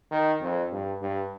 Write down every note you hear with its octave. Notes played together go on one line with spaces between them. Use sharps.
D#3
F2
G2
G2